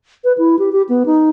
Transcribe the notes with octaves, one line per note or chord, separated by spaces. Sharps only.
B4
E4
G4
G4
B3
D#4